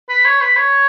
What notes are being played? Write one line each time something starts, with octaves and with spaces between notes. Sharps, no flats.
B4
C#5
B4
C#5